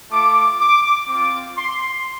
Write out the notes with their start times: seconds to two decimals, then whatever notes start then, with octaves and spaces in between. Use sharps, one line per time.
0.11 A3 F4 D6
0.60 D6
1.08 C4 F4 D6
1.57 C6